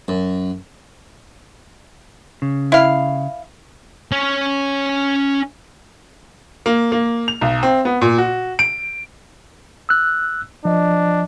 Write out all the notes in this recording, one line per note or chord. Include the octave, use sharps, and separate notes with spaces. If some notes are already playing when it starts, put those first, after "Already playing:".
F#2
C#3
E4 F5
C#4 C#5
A#3
A#3
F7
B1
C4
B3
A#2
F#4
D7
E6 F#6
F3 D4 D#5